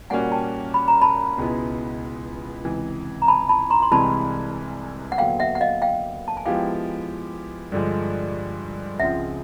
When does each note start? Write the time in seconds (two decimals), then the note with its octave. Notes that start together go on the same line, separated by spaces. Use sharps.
0.10 A#2 G3 A#3 C#4 F#4 F#5 G#5
0.32 G5 A5
0.74 B5
0.88 A#5
1.02 A5 B5
1.38 C#2 B2 G#3 B3 E4
2.65 C#2 C3 E3
3.22 A#5
3.28 A5 B5
3.49 A5 B5
3.70 A#5 C6
3.82 C6
3.91 C2 C3 E3 G#3 A5 B5
5.12 F#5
5.18 D#2 D3 F#3 B3 F5 G5
5.40 E5 F#5
5.55 F#5
5.61 D#5 F5
5.82 F5 G5
6.28 A5
6.37 G#5
6.46 F3 G#3 B3 E4 G4 F5 G5
7.72 G2 D3 F3 G#3
9.00 C#2 C#3 F3 G#3 C4 E5 F#5